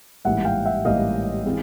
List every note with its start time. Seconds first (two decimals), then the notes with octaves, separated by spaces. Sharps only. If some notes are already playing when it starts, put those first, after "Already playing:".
0.25 A1 G#2 E3 G3 A#3 E5 F#5
0.45 F5 G5
0.65 E5 F#5
0.85 A1 G#2 E3 G3 A#3 D#5 F5
1.45 E3 G#3 C4